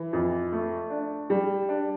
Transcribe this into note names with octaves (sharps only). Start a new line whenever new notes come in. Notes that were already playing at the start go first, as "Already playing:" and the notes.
Already playing: E3
F2
A3
D4
G3
D4